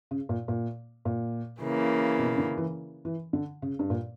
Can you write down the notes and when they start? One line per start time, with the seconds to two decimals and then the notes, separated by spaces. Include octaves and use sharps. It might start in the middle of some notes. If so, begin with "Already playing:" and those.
0.11 C#3
0.29 A#2
0.48 A#2
1.05 A#2
1.62 C#3 E3 A#3
2.19 B2
2.38 D3
2.57 E3
3.05 E3
3.33 D3
3.62 C#3
3.79 G2
3.90 A#2